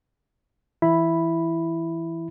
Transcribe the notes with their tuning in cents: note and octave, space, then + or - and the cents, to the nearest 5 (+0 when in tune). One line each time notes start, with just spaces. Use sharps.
E3 +0 E4 +5 B5 +0